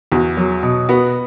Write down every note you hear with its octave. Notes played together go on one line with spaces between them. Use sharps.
E2 F#4
F#3
B2
B3 F#4